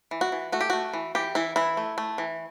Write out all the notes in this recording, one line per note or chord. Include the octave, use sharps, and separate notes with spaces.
E3
F#4
E3
A3 F#4
G4
A3 F#4
E3
E3 G4
E3 E4
E3 E4
A3
A3
E3